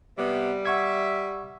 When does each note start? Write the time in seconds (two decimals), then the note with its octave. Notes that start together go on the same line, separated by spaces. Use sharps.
0.18 C3 G3 B3
0.66 E5 F#5 C#6 G#6